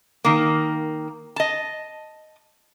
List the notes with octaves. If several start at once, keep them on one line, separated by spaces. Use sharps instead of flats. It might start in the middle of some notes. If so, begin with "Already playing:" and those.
D#3 A#3
D#5 A5